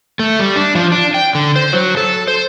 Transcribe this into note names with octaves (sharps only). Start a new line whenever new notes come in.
A3
G3
D4
F3
D4
G5
D3
C5
F#3
A4
C5